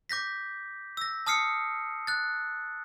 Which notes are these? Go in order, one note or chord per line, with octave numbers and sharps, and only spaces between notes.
D6 G6 A#6 B6
E6 A#6
A5 D#6 F6 C7 C#7
F#6 A6